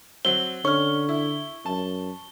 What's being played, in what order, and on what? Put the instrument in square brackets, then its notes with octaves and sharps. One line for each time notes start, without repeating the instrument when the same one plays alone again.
[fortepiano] F#3 C4 [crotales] G7
[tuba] D3 [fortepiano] C#4 F6 [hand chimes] C#6
[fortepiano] E4
[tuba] F#2 [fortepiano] A5